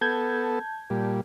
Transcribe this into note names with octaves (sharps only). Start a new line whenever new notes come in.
B3 A4 A5 G6 G#6
A#2 G3